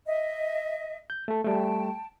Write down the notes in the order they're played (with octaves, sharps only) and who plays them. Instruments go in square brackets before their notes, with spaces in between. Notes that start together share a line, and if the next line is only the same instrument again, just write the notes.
[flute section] D#5 E5
[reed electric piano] G6
A3 A4
[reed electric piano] G3 A3 [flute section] G5 A5